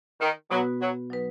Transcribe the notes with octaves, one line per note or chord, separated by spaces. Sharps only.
D#3
B2 F#3 B3 F#4 B4
F#3
F#3 D#4 B4